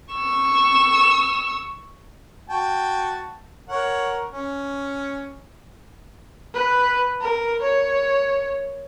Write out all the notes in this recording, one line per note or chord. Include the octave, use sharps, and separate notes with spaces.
C#6 E6
F#4 G5 A5
A#4 C#5 F#5
C#4
B4
A#4
C#5